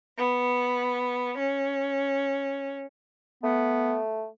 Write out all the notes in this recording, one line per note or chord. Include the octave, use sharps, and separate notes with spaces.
B3
C#4
A3 B3